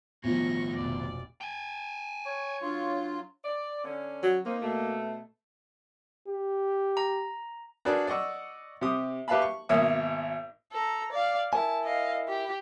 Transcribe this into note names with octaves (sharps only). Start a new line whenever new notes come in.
B1 A2 D#3 F3 C#6 A#6
F1 B2 D5
G5 G#5
C#5
F#3 D4 F4
D5
D3 C#4
F#3
A#3 C4 D#4
B2 A3
G4
A#5
D4 F#4 G#4 A#4 B4 D5
D5 D#5 F#5 C#6 E6
C3 G4 D#6
G4 B4 E5 F5 A5 B5
C#6
G#1 B2 A#3 C#5 E5 D#6
A4 A#5
D5 F5
E4 A#4 G#5 A5
D#5 F5
G4